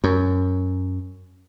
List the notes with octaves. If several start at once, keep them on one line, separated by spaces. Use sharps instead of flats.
F#2